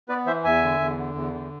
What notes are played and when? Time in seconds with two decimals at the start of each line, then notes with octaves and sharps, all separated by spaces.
0.09 B3 B4 D5
0.26 E3 C5 E5
0.44 E2 E5 G#5
0.62 D3
0.80 E2
0.97 D3
1.15 E2
1.33 D3